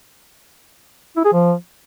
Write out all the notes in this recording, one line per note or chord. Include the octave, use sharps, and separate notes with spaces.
E4
G#4
F3